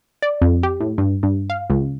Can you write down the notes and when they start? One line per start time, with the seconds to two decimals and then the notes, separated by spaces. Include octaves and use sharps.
0.22 D5
0.42 F2
0.63 G4
0.80 A2
0.98 G2
1.23 G2
1.50 F5
1.70 C#2